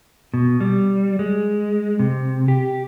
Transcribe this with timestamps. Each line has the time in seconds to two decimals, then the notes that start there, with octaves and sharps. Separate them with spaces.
0.34 B2
0.60 G3
1.19 G#3
1.99 C3
2.48 G4